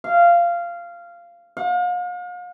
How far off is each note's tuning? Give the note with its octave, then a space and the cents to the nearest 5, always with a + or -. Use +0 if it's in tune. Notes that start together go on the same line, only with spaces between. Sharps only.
F5 -15
F5 +40